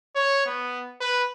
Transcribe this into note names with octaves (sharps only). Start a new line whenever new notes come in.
C#5
B3
B4